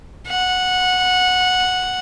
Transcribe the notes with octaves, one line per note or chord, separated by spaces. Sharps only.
F#5